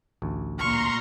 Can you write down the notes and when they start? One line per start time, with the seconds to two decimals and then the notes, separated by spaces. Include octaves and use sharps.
0.22 A1 D2
0.58 C2 A#2 A3 A#5 C6 C#6 F6